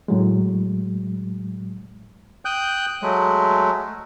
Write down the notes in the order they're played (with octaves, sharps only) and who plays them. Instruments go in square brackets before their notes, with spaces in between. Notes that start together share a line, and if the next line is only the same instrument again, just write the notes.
[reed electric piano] A2 F#3 G#3
[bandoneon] G5 D#6 F#6 G6
F#3 G#3 A3